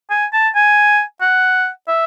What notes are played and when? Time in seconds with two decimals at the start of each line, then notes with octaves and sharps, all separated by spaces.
0.10 G#5
0.33 A5
0.55 G#5
1.21 F#5
1.88 E5